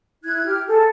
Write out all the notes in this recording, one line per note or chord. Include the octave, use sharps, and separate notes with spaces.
E4 F#6 G#6
G4 F6
G#4 A4